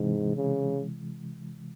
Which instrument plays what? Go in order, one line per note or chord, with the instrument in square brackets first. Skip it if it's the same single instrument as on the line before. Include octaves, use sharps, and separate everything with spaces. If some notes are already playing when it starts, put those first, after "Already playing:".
Already playing: [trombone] G#2 [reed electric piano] C3 E3 G#3
[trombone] C#3